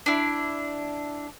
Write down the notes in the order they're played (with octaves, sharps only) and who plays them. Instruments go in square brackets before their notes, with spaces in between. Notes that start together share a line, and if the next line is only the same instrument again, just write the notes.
[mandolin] D4 E4